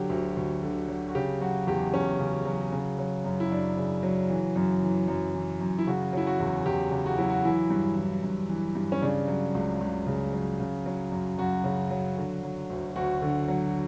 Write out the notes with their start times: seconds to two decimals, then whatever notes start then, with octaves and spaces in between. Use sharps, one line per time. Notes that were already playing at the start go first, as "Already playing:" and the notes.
Already playing: D3 F#3 G4
0.10 D2
0.37 D2
0.63 D3
0.88 F#3
1.09 F#4
1.15 C#3 G4
1.41 F#3 F#4
1.67 E2 G4
1.94 E2 C#4
2.19 C#3
2.45 F#3
2.72 C#3
2.98 F#3
3.25 F#2
3.40 E4
3.51 F#2 D4
3.77 C#3
4.03 F#3
4.30 E3
4.56 F#2
4.83 E3
5.08 F#2
5.34 E3
5.61 F#2
5.79 E4
5.87 C#3 F#4
6.13 F#3 E4
6.27 F#4
6.39 E2
6.66 E2 G4
6.92 C#3
7.06 F#4
7.18 F#3 E4
7.30 F#4
7.45 E3 E4
7.70 G2
7.97 E3
8.24 G2
8.49 E3
8.75 G2
8.92 C#4
9.02 C#3 D4
9.28 F#3
9.55 C#2
9.81 C#2
10.07 C#3
10.33 F#3
10.60 C#3
10.86 F#3
11.12 F#2
11.38 F#2 F#4
11.64 C#3
11.90 F#3
12.17 D3
12.43 F#3
12.70 D2
12.96 D2 F#4
13.22 D3
13.48 F#3